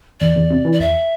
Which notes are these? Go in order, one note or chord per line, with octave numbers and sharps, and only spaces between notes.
E2 D5
E2
C3
E3
D5
E2 E5